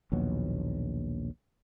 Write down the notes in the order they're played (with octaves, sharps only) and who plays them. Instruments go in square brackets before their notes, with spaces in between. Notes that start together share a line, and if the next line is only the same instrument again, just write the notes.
[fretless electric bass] A#1 D#2 B2 F#3